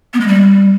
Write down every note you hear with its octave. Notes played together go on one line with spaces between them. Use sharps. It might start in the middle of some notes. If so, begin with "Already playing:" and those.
B3
G#3
G3